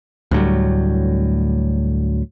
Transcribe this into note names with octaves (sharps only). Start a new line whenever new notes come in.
D2 A2 F#3 G3